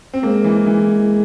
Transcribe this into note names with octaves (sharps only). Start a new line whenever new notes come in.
C4
G#3 A#3
E3
E3